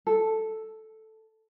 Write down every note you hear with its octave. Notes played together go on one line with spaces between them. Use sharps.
A4